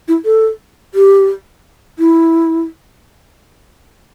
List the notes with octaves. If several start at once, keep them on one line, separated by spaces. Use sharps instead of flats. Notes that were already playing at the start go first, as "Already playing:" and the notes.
E4
A4
G4
E4